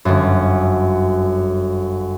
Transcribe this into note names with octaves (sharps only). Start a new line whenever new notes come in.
G1 F#2